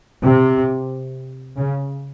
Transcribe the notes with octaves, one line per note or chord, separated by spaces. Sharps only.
C3
C#3